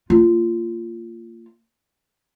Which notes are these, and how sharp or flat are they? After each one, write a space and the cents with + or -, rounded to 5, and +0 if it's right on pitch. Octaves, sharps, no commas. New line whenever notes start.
A#3 -30 F4 -20